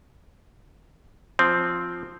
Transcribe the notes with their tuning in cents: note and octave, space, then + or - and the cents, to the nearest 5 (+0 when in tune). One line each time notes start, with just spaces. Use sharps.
F3 +0 C4 +0